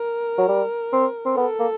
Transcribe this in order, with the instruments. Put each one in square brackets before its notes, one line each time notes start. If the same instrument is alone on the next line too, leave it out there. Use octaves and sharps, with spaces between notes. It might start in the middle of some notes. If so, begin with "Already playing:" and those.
Already playing: [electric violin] A#4
[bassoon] F#3
G3
C4
C4
[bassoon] B3 [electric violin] A4
[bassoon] A#3